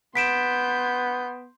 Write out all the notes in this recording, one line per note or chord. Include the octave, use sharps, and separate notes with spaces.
B3 C6 G6 B6 D7 E7